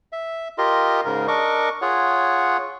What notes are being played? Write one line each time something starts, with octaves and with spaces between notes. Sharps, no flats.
E5
F4 G4 A#4 D#5 C6
G#2 C#3 A#4
D4 A#4 D#5 C#6 D6
F4 G#4 C#5 F#5